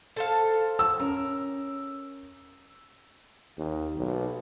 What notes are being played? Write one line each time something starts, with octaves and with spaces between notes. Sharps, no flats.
A4 C5 F5
E6
C#4 A#4
D#2
B1